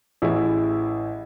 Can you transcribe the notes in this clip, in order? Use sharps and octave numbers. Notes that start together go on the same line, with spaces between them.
A1 E4 G#4